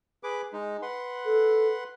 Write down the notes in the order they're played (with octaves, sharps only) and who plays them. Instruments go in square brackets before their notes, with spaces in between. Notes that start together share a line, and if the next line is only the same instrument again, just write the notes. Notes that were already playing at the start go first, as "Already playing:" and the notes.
[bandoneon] G#4 B4 D6
G#3 D#4
B4 F#5 C6
[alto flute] A4